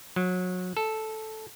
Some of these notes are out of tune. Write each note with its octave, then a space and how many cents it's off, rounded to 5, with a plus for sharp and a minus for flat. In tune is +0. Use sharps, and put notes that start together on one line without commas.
F#3 -25
A4 -5